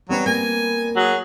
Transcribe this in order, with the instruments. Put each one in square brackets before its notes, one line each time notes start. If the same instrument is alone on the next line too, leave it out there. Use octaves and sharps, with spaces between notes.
[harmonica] F#3 [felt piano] G3 B3 C4
[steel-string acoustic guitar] A#3 A#4 [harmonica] G#5
[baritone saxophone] F#3 [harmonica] G#4